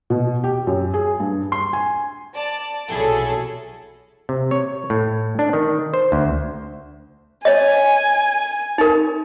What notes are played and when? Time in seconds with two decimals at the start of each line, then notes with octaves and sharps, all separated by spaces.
0.10 B2
0.44 G4
0.67 F#2
0.94 G#4
1.20 G2
1.52 C6
1.73 G#5
2.34 D5 A5
2.88 B1 C3 F#3 E4 G#4 A4
4.29 C3
4.51 C#5
4.90 A2
5.39 D4
5.53 D#3
5.94 C5
6.12 D2
7.45 C#5 D#5 G#5
8.78 D#4 A#4